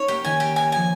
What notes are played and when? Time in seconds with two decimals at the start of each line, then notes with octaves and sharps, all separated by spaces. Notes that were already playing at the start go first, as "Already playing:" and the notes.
Already playing: C#4 D#4 C#5
0.08 A#3 G4
0.25 D#3 G#5
0.40 G4
0.56 G#5
0.72 F3 G#5